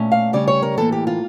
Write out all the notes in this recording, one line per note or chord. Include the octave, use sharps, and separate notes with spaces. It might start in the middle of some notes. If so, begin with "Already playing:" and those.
Already playing: A#2 A3 C#4
F5
C#3 G3 C#4 D5
C#5
A#4
A2 E3 A#3 A4
G4
F4